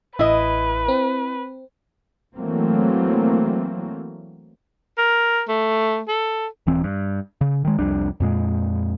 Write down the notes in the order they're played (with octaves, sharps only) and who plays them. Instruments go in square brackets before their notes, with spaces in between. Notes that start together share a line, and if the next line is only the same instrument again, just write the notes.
[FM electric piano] A1 B5 [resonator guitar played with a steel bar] E4 D#5 [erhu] B4
[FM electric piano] C4
[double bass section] E3 F#3 A3 A#3 C4
[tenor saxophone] A#4
A3
A4
[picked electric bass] D#1 E3 C4
G2
C#3
D#3 G#3
C2 F2 G3 D4
F2 A#2 G#3